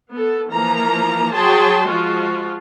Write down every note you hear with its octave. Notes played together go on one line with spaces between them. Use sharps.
B3 A4
E3 F3 A#3 A#5
F#3 G#4 G5 A5 C6
F3 G#3 F4 F#4